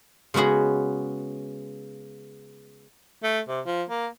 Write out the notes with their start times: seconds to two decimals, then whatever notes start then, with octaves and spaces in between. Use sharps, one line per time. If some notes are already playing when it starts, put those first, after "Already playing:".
0.34 C#3 G#3 B3 F#4 G#4
3.23 A3
3.48 C3
3.66 F3
3.89 A#3